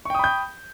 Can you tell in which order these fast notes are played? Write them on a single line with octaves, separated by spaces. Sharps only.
C#6 G5 D#6 B5 G6